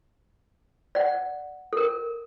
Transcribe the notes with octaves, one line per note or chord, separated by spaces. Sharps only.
D5 F#5
A4 A#4